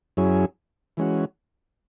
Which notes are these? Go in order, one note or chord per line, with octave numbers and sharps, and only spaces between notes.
F#2 F#3 C#4 E4 G#4
E3 G#3 C#4 F#4